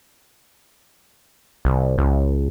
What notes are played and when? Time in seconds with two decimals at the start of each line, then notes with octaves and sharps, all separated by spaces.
1.65 C2
1.98 C#2